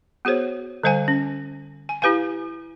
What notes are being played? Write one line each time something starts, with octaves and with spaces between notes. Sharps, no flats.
B3 F#4 G#4 C5 C#5
D3 G3 C5 F5 G#5
C#4
G#5
E4 G4 B4 F5 G#5